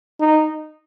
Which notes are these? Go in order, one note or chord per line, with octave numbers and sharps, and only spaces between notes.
D#4